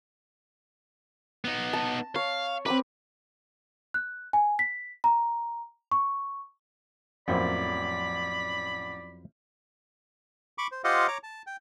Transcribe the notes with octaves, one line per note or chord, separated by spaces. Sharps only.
B3 D#4
A5
C#5 F5
C4 B4 B5 D6
F#6
G#5
B6
A#5
C#6
A1 F2 F#3 A#3 E4 C5 D5 B5
B5 C#6 D6
C5
F4 G4 C5 D#5 F5 F#5
C#5 A#5 D6
A5
G5